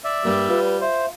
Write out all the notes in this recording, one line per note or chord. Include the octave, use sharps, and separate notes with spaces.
D5 E5
G2 G3 A#3
F4 B4
C5 E5